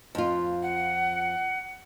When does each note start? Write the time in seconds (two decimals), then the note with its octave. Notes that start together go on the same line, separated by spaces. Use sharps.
0.15 F2 F4
0.63 F#5